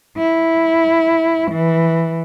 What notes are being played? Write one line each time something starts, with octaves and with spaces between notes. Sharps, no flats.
E4
E3